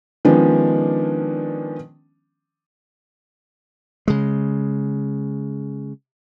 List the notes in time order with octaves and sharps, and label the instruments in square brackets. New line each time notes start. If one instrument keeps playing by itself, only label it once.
[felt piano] D#3 F3 G#3 B3 C#4 D4
[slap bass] C#3 G#3